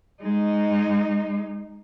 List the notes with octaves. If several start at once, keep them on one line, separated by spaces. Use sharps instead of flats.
G#3 D#4